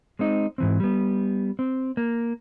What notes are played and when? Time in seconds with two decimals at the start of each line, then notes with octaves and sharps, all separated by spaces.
0.19 G#3 C4 D#4
0.58 G#2 E3 C4
0.80 G3 B3
1.59 C4
1.97 A#3